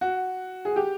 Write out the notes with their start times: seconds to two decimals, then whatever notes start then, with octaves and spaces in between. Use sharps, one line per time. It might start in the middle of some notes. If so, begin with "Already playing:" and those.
0.01 F#4
0.65 G#4
0.76 G4